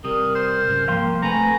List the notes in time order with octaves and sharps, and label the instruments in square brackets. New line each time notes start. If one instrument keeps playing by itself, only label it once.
[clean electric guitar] C3 G3 [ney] A#4 [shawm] D#6
[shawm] C5
[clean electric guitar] G#2 C#3
[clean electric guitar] C2 F3 [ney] A#3 [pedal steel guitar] F5 G5 C6
[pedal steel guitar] A3 [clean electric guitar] C4 B4 [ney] G#5 [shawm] A#5